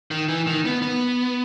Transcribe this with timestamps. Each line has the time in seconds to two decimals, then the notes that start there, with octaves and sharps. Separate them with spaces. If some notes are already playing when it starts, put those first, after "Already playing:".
0.11 D#3
0.28 E3
0.47 D#3
0.65 B3
0.82 B3